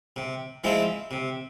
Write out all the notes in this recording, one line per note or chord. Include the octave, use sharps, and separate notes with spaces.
C3
F3 G#3 C4 E4
C3